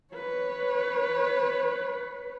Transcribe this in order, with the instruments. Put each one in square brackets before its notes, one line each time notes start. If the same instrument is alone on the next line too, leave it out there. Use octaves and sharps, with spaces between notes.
[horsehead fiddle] B4 C#5